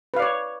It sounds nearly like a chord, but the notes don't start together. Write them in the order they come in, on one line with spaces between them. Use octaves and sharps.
B4 F5 D5 C#5